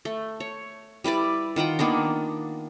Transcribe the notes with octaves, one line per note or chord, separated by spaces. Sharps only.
A3
C#5
G3 E4 B4 D5
D#3 F4 F#5 G5
D#3 A#3 B3 D4